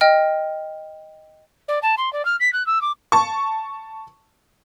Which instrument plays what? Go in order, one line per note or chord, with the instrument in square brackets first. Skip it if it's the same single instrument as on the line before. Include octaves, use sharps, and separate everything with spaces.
[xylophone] D#5 G5 F6
[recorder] D5
A5
C6
D5
F6
B6
F#6
E6
D6
[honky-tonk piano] A5 C#6